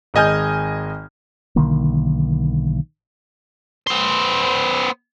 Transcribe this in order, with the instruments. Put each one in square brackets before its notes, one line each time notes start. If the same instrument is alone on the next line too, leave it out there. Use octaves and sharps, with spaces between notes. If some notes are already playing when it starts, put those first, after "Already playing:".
[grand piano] G#1 G#3 D#5 G#5 F6 G6
[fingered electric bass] B1 D3 D#3 A#3
[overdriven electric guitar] B3 C5